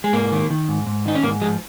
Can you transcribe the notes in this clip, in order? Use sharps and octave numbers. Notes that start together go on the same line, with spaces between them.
G#3
G#2 A#3
D#3
D#3
G#2
G#2
D#3 D#4
C#4
G#2 A#3
F3 G#3